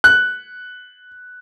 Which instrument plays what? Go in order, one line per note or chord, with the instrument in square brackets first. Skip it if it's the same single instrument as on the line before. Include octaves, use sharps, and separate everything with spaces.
[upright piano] F#6